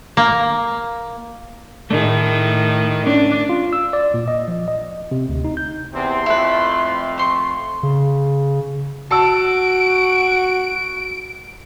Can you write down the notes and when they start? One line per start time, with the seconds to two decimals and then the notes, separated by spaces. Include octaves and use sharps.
0.17 A#3
1.91 A2 D#3 A3 G#4
3.07 C#4 D4
3.49 F4
3.73 E6
3.93 D5
4.14 A#2
4.28 D#5
4.48 F3
4.68 D#5
5.11 C3
5.29 D2
5.45 D#4
5.57 G6
5.94 E2 C3 C4 C6
6.26 F2 A3 E4 B4
7.18 C5 C6 C#6
7.83 C#3
9.11 F#4 A5 E6 D7